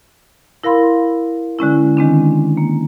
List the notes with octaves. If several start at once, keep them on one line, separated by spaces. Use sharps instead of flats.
E4 A#4 F5 B5 C6
D3 G#3 C#4 E4
D#3 G#3 C4 D4
A#3